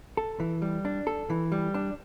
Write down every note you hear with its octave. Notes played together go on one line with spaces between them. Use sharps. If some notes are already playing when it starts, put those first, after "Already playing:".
A4
E3
G3
D4
A4
E3
G3
D4